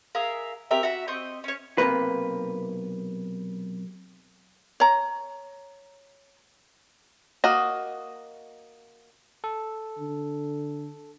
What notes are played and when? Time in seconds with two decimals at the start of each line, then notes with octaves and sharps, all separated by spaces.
0.15 G#4 A#4 E5 F5
0.71 C4 G4 A#4 E5
0.83 F#4 E5
1.08 C4 D#5 C#6 G6
1.44 C#4 C#5
1.78 B1 C3 E3 A#3 B4
4.80 C#5 A#5
7.44 A#3 F#4 D#5
9.44 A4
9.98 D3